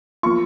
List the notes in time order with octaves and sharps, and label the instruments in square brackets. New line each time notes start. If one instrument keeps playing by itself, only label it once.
[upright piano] F3 A#3 F4 C#6